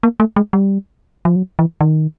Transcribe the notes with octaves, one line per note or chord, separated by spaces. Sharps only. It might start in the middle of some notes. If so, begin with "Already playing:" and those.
A#3
A3
G#3
G3
F3
F#3
E3
D#3